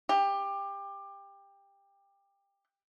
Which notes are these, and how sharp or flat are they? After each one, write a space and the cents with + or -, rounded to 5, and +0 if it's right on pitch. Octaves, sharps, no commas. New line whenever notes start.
G4 +20